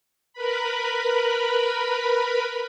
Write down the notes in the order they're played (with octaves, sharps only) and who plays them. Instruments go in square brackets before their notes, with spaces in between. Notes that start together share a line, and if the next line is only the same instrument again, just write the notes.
[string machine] A#4 B4 B5